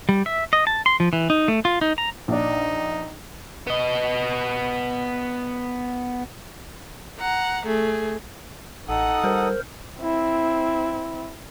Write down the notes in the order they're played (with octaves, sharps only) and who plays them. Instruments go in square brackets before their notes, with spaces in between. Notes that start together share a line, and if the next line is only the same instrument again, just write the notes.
[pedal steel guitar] G3
E5
D#5
A5
C6
F3
E3
D#4
A3
F4
D#4
A#5
[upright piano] A#1 D4 [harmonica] D#4
[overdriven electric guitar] B3 D#5
[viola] F#5 A#5
A3 G#4
[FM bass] A1 [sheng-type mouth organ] D#4 A4 D#6 [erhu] F#5
[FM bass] G3 [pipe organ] A#4 C5
[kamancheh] C4 E4